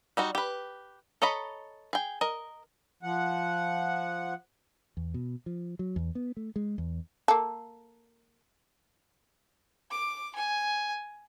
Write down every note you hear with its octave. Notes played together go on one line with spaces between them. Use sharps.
G3 D#4 F#4
G4 B4
A4 C#5 D#5 A#5 B5
G#4 G5
A#4 D#5
F3 F#5
E2
B2
F3
F#3
E2
B3
A3
G#3
E2
A#3 A4
D6
G#5